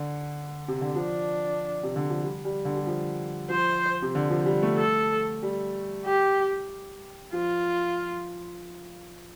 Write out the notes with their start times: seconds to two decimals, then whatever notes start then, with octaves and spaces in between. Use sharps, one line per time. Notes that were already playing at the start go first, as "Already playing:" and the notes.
Already playing: D3
0.68 C3
0.81 D3
0.95 F3 D4
1.83 C3
1.96 D3
2.10 F3
2.22 G3
2.45 G3
2.65 D3
2.76 G3
2.87 F3
3.50 F3 C5
4.02 C3
4.15 D3
4.30 F3
4.46 G3
4.62 A3
4.78 A4
5.42 G3
6.06 G4
7.33 F3 F4